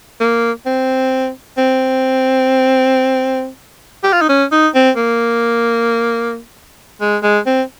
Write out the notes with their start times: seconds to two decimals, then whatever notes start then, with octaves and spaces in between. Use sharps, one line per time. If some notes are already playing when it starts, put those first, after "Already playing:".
0.20 A#3
0.66 C4
1.57 C4
4.04 G4
4.13 F4
4.21 D#4
4.29 C#4
4.52 D#4
4.75 C4
4.96 A#3
7.01 G#3
7.23 G#3
7.46 C4